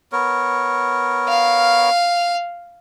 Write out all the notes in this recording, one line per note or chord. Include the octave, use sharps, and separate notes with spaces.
B3 A#4 C#5
F5